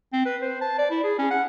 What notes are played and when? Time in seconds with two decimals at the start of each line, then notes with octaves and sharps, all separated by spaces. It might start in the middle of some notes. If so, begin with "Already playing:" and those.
0.13 C4
0.25 B4
0.41 C5
0.61 A5
0.78 D5
0.90 E4
1.04 G#4
1.18 C#4
1.31 F#5